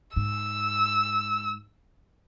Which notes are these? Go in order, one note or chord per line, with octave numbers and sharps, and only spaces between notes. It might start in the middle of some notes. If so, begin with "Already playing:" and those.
G#2 E6